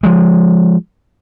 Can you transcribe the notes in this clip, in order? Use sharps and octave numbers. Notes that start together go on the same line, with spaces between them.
F3 G#3